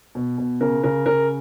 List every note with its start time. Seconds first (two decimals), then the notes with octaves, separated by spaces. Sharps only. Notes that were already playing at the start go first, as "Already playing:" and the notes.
0.15 B2
0.38 B2
0.61 C#3 A#4
0.84 C#3 A#4
1.06 C#3 A#4